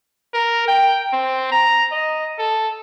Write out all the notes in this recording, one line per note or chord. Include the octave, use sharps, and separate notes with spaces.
A#4
G5
C4
A#5
D#5
A4